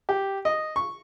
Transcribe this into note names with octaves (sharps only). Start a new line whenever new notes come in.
G4
D#5
C#6